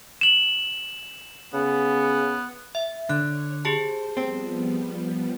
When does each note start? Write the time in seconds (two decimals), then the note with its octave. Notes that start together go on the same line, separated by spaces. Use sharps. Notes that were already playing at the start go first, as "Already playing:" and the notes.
0.21 E7 F#7
1.54 C#3 B3
2.75 E5
3.09 D3 C#5 F#6
3.65 G4 G#4 C5 A5
4.17 F3 G3 B3 C4